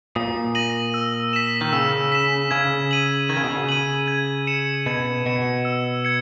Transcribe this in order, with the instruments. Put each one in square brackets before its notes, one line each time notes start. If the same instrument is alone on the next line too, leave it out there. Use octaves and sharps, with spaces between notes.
[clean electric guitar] A#2 [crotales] D#6
[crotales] A#6 D#7 F#7
E6
B6 E7
[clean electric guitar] D#3
[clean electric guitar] C#3 [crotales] E6
[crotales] B6 E7
[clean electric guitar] C#3 [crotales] G#6
[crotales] D#7 F#7
[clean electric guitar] D#3 [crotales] G#6
[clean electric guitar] C#3
B2
C#3
[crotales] D#7 F#7
G#6
C#7 E7
[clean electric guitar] B2 [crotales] G#6
[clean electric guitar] B2 [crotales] C#7 E7
[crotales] E6
G#6 C#7